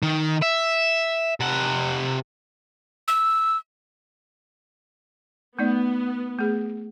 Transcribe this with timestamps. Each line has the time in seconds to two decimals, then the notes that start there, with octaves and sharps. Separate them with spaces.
0.03 D#3
0.42 E5
1.40 C3 F#5
3.08 E6
5.59 A3 B3 D#4 D5
6.38 A3 G#4